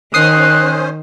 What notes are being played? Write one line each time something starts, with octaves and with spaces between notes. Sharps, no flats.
D#3 C#4 C5 D#6 F#6 C7